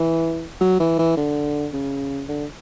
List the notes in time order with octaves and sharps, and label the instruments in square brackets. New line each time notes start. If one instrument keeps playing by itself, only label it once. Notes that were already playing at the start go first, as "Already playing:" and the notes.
Already playing: [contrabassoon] E3
F#3
E3
E3
D3
C#3
D3